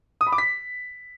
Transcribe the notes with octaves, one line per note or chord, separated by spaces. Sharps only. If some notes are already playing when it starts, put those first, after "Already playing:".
D#6
B5
D6
B6